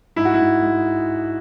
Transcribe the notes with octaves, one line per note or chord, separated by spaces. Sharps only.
G#2 E4
F#4
E4
G#2
G#3